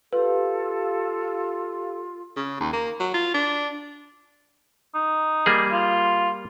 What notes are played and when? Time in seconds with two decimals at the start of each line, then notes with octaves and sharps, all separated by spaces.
0.13 F4 G4 A4 B4 F5
2.37 C#3
2.60 D#2
2.73 A#3
3.00 F#3
3.14 F4
3.34 D4
4.95 D#4
5.46 G3 A#3 G#4
5.71 F4